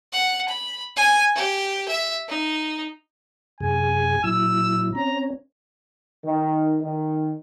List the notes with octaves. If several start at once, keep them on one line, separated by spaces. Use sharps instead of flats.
F#5
B5
G#5
G4
E5
D#4
F#2 C3 G#4 G#5
A#2 F#3 E4 E6
C4 C#4 C#5 A#5
D#3
D#3